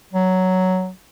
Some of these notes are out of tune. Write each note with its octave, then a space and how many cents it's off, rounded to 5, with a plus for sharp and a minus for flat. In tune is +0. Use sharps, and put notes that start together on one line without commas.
F#3 +5